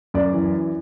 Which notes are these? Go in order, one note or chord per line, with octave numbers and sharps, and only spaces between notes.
F#2 D5
E3